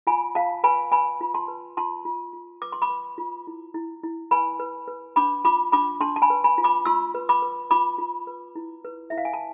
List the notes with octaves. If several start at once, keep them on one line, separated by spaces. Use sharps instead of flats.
F4 G#5 B5
F4 F5 A5
B4 G#5 B5
B4 G#5 B5
F4
A5 C6
B4
F4 A5 C6
F4
F4
B4 D6
C6
B5 D6
B4
F4
E4
E4
E4
B4 G#5 B5
B4
B4
D4 B5 D6
F4 B5 D6
D4 B5 D6
D4 A5 C6
A5
G#5 B5
B4
G#5 B5
F4
B5 D6
F4 C6 E6
B4
B5 D6
B4
F4 B5 D6
F4
B4
E4
B4
E4 E5
F5
G#5
A5